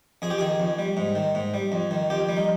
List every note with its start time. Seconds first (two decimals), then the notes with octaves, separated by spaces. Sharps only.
0.22 F2 G#4
0.30 G4
0.38 D#3 G#4
0.60 F2
0.79 G3
0.97 G#2
1.15 D#3
1.35 G#2
1.54 G3
1.72 F2
1.91 D#3
2.10 F2 G4
2.29 G3
2.37 D#4